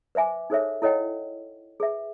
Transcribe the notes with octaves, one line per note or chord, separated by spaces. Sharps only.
B4 C5 E5 G#5 D6
D#4 G#4 A4 C5 C#5 E5
E4 A4 C#5 D#5 F#5 G5
G#4 B4 E5